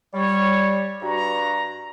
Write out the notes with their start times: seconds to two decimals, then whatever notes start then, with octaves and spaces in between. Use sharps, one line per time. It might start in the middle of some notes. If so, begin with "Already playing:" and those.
0.14 G3 C#5
1.02 G2 F#4 A#5